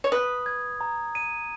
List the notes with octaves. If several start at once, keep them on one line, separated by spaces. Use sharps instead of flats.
C#5
B4 D#6
G#6
A#5
D#7